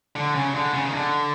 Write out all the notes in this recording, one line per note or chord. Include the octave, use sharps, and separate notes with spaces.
D3
C#3
D3
C#3
D#3
D3